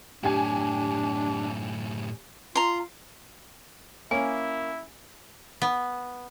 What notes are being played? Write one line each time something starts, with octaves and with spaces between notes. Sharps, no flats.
F#2 A2 D4 G4 G#5
F4 A#5 C6
A#3 C#4 E4 G#5
B3